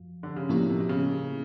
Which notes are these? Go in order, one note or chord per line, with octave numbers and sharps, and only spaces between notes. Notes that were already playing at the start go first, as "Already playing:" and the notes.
Already playing: F#2 F3
D3
C#3
A2 C3 F3 A#3 C#4 E4
B2
C3
B2
C#3